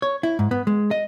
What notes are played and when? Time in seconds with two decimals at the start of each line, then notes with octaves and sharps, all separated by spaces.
0.02 C#5
0.23 E4
0.39 G#2
0.51 B3
0.67 G#3
0.91 D#5